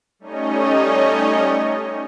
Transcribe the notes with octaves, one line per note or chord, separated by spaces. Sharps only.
G3 A3 C#4 D#4 C#5 D#5